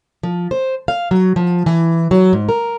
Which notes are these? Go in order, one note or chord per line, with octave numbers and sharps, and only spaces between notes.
F3
C5
F5
F#3
F3
E3
F#3
G#2
A#4